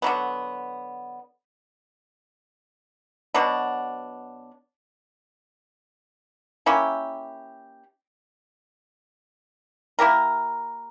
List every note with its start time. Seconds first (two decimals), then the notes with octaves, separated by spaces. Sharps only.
0.02 D3 F#3 B3
3.34 B2 F#3 B3 D4
6.66 A#3 C#4 E4 G4
9.99 A#3 E4 G4 A#4